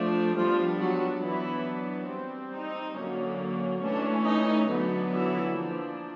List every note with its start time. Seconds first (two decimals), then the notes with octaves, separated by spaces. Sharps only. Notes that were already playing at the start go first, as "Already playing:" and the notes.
Already playing: F3 A3 D4
0.37 F3 G3 B3 D4 F4
0.80 F#3 F#4
1.24 E3 F#3 B3 D4 E4
2.11 G3 C4
2.54 D#4
2.97 D3 F#3 A#3 C#4
3.83 E3 A3 C#4 D4
4.27 D#4
4.70 D3 F#3 B3 D4
5.13 E3 E4
5.56 F3 A#3 D4